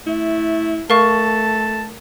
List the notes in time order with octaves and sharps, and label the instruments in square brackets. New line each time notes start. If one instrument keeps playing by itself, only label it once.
[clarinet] A3 [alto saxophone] E4
[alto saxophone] A3 [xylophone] A#4 F5 C#6 [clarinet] A5